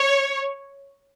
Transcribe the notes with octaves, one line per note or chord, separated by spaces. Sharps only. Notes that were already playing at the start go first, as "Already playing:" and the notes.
Already playing: C#5